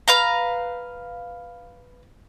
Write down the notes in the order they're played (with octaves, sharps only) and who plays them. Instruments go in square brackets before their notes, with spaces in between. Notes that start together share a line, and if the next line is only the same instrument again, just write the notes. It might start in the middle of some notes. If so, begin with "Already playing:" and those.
[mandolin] B4 F5 A#5